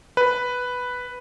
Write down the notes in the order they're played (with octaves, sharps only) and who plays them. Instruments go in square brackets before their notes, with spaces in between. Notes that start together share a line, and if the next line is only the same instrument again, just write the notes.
[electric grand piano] B4